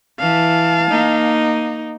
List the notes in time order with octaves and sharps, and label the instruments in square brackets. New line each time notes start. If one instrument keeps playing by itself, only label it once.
[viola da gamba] E3 [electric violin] F5 A5
[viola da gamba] A#3 [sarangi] D#4